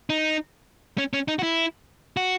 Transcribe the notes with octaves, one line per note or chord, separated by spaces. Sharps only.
D#4
C#4
C#4
D#4
F#4
E4
F#4